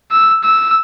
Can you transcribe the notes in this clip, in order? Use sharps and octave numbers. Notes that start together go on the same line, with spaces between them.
E6
E6